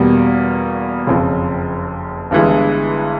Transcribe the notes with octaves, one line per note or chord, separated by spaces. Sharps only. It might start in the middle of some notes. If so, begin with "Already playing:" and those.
Already playing: E2 B2 G3 A#3
F#1 F2 C#3
G1 G2 E3 G#3